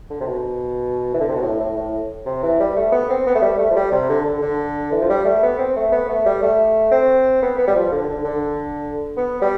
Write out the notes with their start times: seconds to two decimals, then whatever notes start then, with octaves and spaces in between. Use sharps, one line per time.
0.10 D3
0.20 C3
0.27 B2
1.14 E3
1.20 D3
1.28 C3
1.36 B2
1.42 A2
1.60 A2
1.77 A2
2.26 C3
2.43 E3
2.60 G3
2.76 A3
2.92 B3
3.10 C4
3.26 B3
3.35 A3
3.42 G3
3.58 A3
3.70 F3
3.76 G3
3.92 C3
4.09 D3
4.25 D3
4.42 D3
4.92 E3
5.01 F3
5.09 G3
5.25 A3
5.43 B3
5.58 C4
5.76 A3
5.92 B3
6.09 A3
6.26 G3
6.42 A3
6.91 C4
7.42 B3
7.58 B3
7.67 G3
7.75 F3
7.92 D3
8.09 D3
8.24 D3
9.17 B3
9.42 G3